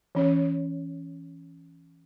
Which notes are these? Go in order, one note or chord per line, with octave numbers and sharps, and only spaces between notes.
E3 C#4 C#5